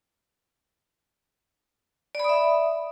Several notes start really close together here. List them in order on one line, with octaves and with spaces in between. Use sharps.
D5 B5 D#6 E5